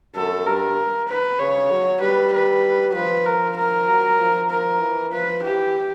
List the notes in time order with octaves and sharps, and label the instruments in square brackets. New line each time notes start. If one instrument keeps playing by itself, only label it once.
[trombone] F#2 [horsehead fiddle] A4
[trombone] G2 [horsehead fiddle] A#4
[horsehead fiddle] B4
[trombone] C#3 [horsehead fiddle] C#5
[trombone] F#3
[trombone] G3 [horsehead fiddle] B4
[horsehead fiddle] B4
[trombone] F3 [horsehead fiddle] B4
[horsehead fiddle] A#4
A#4
[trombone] F#3
F3
[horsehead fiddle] A#4
[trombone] E3
[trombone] F3 [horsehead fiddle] B4
[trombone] E3 [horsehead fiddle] G4